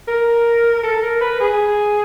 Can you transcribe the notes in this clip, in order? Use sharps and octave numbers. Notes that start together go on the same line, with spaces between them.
A#4
A4
A#4
B4
G#4